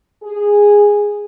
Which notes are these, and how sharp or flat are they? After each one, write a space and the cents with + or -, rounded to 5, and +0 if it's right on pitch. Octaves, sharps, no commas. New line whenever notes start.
G#4 -10